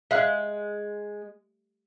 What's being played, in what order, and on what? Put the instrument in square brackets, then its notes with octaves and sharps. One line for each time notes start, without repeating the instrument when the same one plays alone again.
[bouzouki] G#3 [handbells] E5 F5 F#6